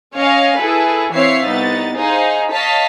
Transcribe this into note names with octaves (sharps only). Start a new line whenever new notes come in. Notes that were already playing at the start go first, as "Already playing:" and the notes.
C#4 C#5 D#5 F5 G#5
E4 G#4 A4 B4
E3 C4 C#5 E5 F5 C7
C2 B3 D#4 A6
D#4 G#4 C5 F5
C#5 D#5 F5 A5 B6